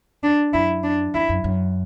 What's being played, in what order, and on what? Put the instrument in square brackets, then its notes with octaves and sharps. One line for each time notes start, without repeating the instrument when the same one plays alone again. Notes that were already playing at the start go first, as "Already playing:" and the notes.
[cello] D4
[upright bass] F#2 [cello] E4
[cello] D4
[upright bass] E2 [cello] E4
[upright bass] F#2
F#2